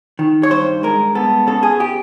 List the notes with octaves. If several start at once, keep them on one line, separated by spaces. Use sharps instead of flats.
D#3
C#5
G2 C5
G#3 A#4
B3 A4
C#3 A4
G#4
G4